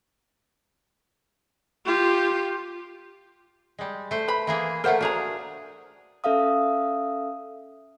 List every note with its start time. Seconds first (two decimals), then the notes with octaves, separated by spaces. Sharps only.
1.85 F4 G4
3.78 G3 G#3
4.11 A3 C5
4.28 B4 B5
4.47 E3 A#3 G#4
4.84 A3 F4 A#4 C5 F#5
5.01 D4 F#4 G#4 A#5
6.24 C#4 A4 E5 F5 D#6